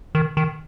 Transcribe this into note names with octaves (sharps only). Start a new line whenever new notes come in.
D#3
D#3